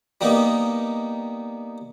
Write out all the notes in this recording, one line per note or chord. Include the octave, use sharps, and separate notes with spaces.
G3 A#3 B3 D#4